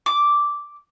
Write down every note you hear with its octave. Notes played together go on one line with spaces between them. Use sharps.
D6